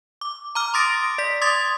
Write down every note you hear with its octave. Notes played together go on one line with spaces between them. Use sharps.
D6
A#5 D6 F6
C6 D6 D#6 A6 A#6 D7
D5 B6
C6 D6 D#6 G#6 A6